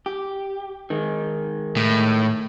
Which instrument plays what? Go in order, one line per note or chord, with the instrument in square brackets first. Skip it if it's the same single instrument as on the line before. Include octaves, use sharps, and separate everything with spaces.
[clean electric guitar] G4
D#3 G#3
[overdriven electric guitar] A2